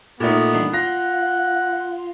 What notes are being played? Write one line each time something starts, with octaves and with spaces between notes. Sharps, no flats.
A#2 A3 B3 D#4
E3 G3 D4
F4 F#5 A#6